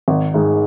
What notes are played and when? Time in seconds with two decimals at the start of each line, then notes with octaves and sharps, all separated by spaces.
0.08 G#1
0.34 G#2 D#3 G#3